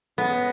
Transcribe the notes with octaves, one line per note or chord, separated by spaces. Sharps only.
G#3 B3 C#4 G#4 B4